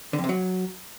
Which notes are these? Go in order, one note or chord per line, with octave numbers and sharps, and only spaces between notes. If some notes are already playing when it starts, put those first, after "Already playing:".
D3
F2
C3
F#3